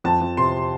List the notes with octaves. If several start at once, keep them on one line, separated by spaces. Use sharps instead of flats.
F2 A5
F2
C3 C6